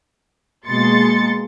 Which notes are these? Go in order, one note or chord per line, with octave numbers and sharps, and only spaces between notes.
B2 G#3 A#3 C6 A6 C#7